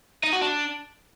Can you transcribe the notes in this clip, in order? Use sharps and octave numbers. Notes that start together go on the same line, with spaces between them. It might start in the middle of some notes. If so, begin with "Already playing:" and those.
D#4
F#4
D4